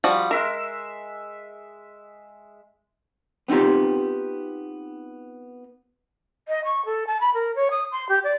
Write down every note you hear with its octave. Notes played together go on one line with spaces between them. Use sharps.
F3 G3 F#4
G#3 A#4 E5 E6
B3 C4 D#4 F4 G4
D#5
C#6
A4
A5
B5
A#4
C#5
D#6
C6
G4
D5